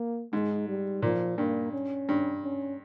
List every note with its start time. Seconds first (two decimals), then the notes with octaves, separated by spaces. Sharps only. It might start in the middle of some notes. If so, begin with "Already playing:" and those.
Already playing: A#3
0.33 G#2 G#3
0.68 G3
1.02 A#2 F3
1.38 G2 A#3
1.73 C#4
2.09 G2
2.43 C#4